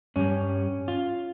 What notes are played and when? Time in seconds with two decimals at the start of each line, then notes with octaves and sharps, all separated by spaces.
0.16 G2 G3 C#4
0.88 F4